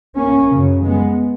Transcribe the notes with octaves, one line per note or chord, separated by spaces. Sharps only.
A#3 C#4
F#2 C#3
G#3 B3